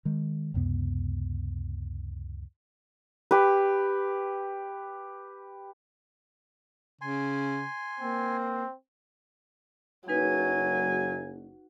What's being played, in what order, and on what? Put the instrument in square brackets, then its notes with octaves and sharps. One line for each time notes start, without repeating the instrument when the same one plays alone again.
[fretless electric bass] D#3 G#3
C#2 F#2 C3 B3
[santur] G4 B4
[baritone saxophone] C#3 [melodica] G#5 C6
[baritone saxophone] A#3 [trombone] C4
[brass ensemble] F#1 [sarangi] F#3 [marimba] D#4 B4 [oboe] G#5